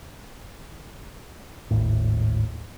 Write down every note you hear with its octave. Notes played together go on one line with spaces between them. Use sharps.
G#1 D#2 A2